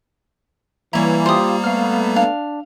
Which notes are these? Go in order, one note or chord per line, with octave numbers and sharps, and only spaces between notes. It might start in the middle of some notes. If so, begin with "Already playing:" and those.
E3 G3 A#3 E4 C#5 A#5
F4 G4 C5 D#6
A3 B3 F5 F6
D4 F5